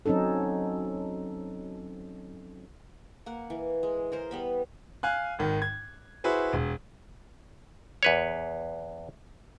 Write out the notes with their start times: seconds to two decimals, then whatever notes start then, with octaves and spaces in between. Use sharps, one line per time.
0.06 F#3 C4 C#4 D#4 A4
3.26 A#3 F#5
3.50 E3
3.83 G#3
4.12 G#4 A#4 C5
4.31 G3 B3 B5
5.03 F5 G#5 F#6
5.39 G#1 D#3
5.62 G#6
6.24 E4 F#4 G#4 B4 C5
6.53 E1
8.03 E2 B4 C#5